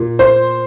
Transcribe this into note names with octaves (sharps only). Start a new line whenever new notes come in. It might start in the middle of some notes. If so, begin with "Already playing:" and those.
Already playing: A#2
C5